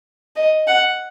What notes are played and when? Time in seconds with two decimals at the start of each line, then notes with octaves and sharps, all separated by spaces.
0.36 D#5
0.67 F#5